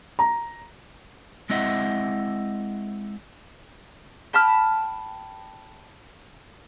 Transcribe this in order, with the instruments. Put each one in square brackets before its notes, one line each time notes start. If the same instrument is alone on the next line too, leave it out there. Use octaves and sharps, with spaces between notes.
[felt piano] A#5
[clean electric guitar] G#3 C4 E4 D#5 E5 F#5
[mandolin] G5 A5 B5 F6